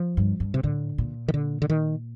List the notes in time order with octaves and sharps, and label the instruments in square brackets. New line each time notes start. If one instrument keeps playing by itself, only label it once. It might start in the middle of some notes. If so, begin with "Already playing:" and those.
Already playing: [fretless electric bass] F3
[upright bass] G2
G2
[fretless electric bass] C3
[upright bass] A2 [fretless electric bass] D3
[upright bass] A#2
[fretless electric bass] D#3
D3
D3
D#3